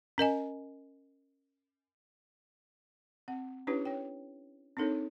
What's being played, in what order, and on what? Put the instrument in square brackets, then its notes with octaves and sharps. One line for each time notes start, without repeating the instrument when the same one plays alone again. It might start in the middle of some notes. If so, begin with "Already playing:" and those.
[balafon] C#4 A#4 D#5 G#5
C4 F#5
C#4 D4 E4 G4 B4 C#5
C#5 G5
C4 D4 D#4 A4 A#4 C#5